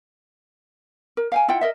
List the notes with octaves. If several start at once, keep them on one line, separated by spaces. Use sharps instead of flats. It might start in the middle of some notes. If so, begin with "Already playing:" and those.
A#4
F5 G5 G#5
E4 F4 F#5 G5
A#4 D#5 E5